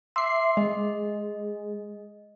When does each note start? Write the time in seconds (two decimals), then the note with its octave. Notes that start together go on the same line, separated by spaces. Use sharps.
0.16 E5 C6 D6 C7
0.57 G#3 D#5